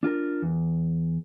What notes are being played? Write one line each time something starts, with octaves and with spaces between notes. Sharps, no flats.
D4 F4 G#4 A#4
E2